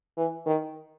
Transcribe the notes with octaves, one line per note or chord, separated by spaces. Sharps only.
E3
D#3